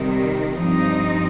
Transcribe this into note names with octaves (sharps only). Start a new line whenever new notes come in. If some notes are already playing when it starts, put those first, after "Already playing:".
Already playing: C3 D#3 G3
G2 F3 C4 D#4